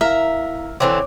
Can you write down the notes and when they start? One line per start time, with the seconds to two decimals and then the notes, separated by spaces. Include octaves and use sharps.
0.01 E4 A#4 E5 F5
0.80 D3 E3 C4 C#5 D6